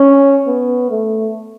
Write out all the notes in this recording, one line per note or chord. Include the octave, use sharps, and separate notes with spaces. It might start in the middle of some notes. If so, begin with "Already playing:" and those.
Already playing: C#4
B3
A3